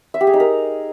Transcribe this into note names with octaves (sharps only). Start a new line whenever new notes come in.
E5
G4
G#4
D#4
A#4